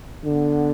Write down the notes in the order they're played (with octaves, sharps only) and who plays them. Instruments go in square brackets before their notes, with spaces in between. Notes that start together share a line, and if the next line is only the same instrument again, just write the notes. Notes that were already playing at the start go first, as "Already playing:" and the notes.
[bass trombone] D3 [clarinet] B3